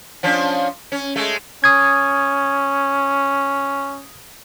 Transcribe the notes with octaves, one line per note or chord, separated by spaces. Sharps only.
F3 C#4 D4
C#4
G#3 A3
C#4 D#6 G#6